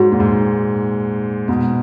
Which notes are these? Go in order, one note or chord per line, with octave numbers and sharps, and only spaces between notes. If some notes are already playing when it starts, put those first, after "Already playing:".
Already playing: G#2 F#4
A#2
G#2
G#2 B2